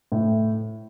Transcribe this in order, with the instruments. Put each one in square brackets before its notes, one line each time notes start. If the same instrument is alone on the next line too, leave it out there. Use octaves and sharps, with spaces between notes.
[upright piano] A2